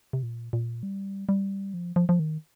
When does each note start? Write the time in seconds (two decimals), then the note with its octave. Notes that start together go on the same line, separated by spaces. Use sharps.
0.13 C3
0.23 A#2
0.53 A#2
0.83 G3
1.29 G3
1.74 F3
1.96 F3
2.09 F3
2.19 D#3